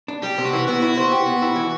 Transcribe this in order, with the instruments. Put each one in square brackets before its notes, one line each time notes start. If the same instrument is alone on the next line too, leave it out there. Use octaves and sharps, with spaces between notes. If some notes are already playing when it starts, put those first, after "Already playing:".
[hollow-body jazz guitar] D4
[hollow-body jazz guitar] G3 [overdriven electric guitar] G4
[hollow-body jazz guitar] C3
[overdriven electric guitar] F#4
[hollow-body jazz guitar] E3
[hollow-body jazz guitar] B3 [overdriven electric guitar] F#4
[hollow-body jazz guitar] E4
C5
G4
B3
E4
E3